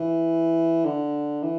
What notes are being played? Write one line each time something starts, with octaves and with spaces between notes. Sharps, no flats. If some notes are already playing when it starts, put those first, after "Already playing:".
Already playing: E3
D3
E3